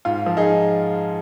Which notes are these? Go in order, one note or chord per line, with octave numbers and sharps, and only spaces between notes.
G#2 F4
F3
D#4 G#4